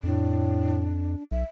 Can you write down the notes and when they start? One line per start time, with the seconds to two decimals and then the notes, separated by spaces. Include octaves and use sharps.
0.03 F2 A2 D4
1.31 B1 E5